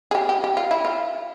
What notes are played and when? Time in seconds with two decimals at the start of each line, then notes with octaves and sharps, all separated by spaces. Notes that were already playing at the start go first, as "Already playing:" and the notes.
0.11 G#4
0.15 G4
0.29 G4
0.44 G4
0.57 F4
0.71 E4
0.85 F4